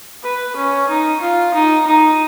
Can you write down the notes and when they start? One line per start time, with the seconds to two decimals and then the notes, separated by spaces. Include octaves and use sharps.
0.23 B4
0.56 C#4
0.89 D#4
1.21 F4
1.54 D#4
1.87 D#4